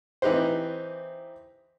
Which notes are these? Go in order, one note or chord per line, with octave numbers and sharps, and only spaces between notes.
E3 C4 D#4 G4 B4 C5